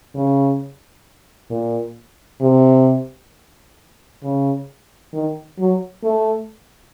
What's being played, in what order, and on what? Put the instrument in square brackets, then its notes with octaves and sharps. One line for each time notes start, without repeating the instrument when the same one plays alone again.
[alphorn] C#3
A#2
C3
C#3
D#3
F#3
A3